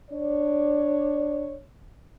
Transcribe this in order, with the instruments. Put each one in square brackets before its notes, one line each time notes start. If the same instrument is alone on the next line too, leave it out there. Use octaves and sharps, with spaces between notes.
[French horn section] D4 C#5 D5